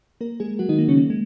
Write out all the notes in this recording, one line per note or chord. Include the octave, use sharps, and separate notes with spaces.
A#3 A#4
G#3 G#4
F#3 F#4
D#3 D#4
A#3
C#3 C#4
A#3
G#3